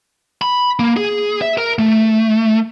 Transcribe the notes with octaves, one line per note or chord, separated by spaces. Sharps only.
B5
A#3
G#4
E5
A#4
A3